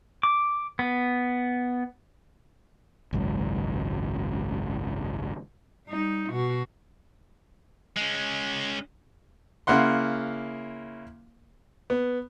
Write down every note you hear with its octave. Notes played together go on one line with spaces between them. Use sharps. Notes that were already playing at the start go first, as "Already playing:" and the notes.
D6
B3
G#1 C#2 F#2
G3 D#4
B2 F#4
G#3 C#4
C#3 A#3 E4 F#5 C6
B3